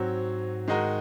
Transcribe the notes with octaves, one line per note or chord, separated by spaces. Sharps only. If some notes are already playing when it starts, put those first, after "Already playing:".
Already playing: G#2 F#3 C4 F#4 C#5
D#3 G#3 D#4 F#4 A#4